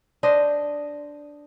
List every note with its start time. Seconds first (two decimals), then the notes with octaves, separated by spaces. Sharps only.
0.23 D4 C5 D#5